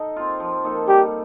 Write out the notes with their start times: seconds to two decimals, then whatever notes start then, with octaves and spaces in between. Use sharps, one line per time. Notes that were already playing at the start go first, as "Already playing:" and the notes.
Already playing: D#4 A4 D#5
0.16 C4 F4
0.40 F3
0.64 A#3 D#4 A4
0.87 G3 G4